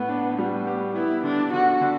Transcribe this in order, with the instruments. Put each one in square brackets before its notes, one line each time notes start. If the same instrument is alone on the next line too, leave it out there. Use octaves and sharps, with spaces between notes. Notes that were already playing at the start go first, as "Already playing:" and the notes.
Already playing: [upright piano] A2 [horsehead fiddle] B3
[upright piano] D4
[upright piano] G3 [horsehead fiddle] B3
[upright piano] G4
[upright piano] B3 [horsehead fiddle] E4
[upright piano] D3 [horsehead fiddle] D4
[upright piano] D3 [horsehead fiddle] F#4
[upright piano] D3